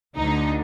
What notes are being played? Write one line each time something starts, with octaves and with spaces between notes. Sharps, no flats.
D2 D3 D#4